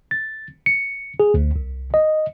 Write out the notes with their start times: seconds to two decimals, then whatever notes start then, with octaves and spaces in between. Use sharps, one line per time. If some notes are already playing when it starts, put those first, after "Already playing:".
0.11 A6
0.66 C#7
1.20 G#4
1.34 D2
1.56 C2
1.94 D#5